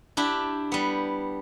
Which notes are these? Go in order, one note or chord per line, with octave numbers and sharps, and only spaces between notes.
D4 E4 G4
G3 B3